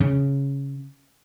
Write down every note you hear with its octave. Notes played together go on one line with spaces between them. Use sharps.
C#3